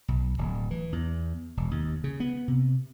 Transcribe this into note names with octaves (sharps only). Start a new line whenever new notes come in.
B1
D1
E3
E2
E1
D#2
C#3
B3
C3